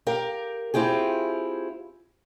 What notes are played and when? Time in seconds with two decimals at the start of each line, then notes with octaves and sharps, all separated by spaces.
0.07 G4 A#4 F5
0.74 C4 E4 F4 G4 G#4